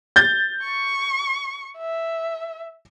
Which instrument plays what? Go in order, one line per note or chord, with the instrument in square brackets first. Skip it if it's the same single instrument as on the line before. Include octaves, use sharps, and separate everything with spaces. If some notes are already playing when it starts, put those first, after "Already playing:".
[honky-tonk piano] G6 A6
[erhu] C#6
E5